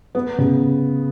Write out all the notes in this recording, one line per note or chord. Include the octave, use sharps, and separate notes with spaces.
B3
C#3